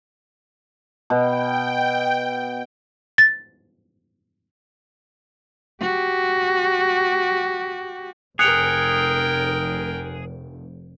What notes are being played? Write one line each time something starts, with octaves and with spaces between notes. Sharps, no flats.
B2 G5
A6
F#4 G4
F1 G#4 A#4 G5 F#6 C#7 F7